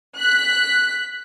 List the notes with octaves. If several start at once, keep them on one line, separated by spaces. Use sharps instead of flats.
F#6 B6